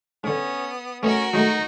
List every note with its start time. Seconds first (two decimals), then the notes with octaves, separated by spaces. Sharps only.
0.24 G#2 D3 B3 C#4 D#6
1.03 A3 B3 C#4 F#4 A#4 D#5
1.33 F#3 G#3 A3 D#4